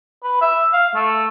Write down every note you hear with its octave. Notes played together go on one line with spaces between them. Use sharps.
B4
E5
F5
A3